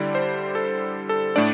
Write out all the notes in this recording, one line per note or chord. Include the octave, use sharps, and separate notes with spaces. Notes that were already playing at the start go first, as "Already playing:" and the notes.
Already playing: D3 G3 E4 D5
C5
A4
A4
A2 A3 D4 D5